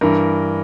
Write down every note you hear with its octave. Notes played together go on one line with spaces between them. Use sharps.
G2 E3 A#4